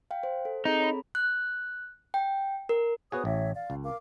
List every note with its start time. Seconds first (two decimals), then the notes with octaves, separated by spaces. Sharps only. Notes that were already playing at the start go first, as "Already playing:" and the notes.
0.11 F5 G5
0.23 C5
0.45 A4
0.65 C4 D#4 G#4 A4
0.80 C#5 A#5 B5
1.15 F#6
2.14 G5
2.69 A#4
3.12 B3 F#4 G#4 C5 C#5 D#6
3.25 A1 C#5 E5
3.55 D5 F5
3.70 C#2
3.84 A#4 F5 D6